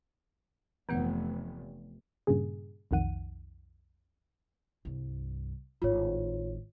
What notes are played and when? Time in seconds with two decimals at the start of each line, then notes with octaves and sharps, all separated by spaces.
0.89 F1 E3 B3 F#5
2.27 G2 A#2 C#3 G#4
2.91 B1 F2 D#3 F#5 D#7
4.85 C2 G2
5.82 G#1 A2 F4 C#5